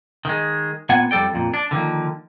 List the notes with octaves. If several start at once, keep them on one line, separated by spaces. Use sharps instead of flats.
D#3 G#3
A#2 B3 C4 F#5 G#5
F2 G3 A4 D5 G5
F2 A#2
D4
D3 D#3 F3 A#3